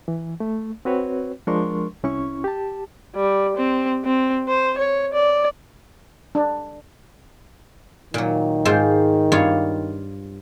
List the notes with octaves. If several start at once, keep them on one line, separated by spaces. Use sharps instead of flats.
E3
A3
C4 F#4 B4 C#5
F3 G#3 D4 A#4 C6 C#6
C2 C#4 E4 C#6
G4 A5
G3
C4
C4
C5
C#5
D5
D4
A#2 D#3 F#3
G#2 F4 C5
G2 F4 C#5